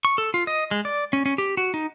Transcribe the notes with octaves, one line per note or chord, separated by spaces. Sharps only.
C#6
A4
F4
D#5
G#3
D5
C#4
C#4
G4
F#4
D#4